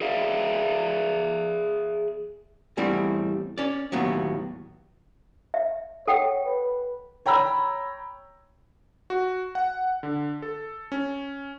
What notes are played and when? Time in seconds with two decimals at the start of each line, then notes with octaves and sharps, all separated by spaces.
0.01 G#4 D5 E5 F5
2.77 E2 A2 G3 C4 E4
3.58 C#4 D5
3.92 D#2 A2 F#3 B3
5.54 E5
6.08 A4 C#5 F#5 G5
6.45 B4
7.26 C#5 G5 A#5 B5 E6
9.10 F#4
9.55 F#5
10.03 D3
10.42 A4
10.92 C#4